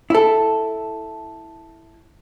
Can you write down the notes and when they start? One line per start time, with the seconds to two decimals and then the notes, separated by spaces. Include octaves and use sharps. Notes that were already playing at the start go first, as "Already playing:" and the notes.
0.10 E4 A4